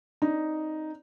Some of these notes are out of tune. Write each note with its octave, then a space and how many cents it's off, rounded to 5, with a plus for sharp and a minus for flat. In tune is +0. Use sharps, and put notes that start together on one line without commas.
C4 +10 D#4 +0 D5 +0